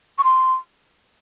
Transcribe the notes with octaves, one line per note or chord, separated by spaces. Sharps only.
C#6
C6